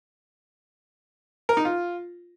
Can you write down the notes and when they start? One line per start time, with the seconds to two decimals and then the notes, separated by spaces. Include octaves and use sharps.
1.49 A#4
1.57 D#4
1.65 F4